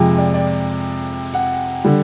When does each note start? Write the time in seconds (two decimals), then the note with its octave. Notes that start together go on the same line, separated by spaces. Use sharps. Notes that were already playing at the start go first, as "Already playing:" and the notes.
Already playing: F2 C3 F3 G#3
0.18 D5
0.34 D5
1.34 F#5
1.85 D3 G3